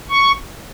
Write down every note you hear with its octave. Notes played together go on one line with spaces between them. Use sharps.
C#6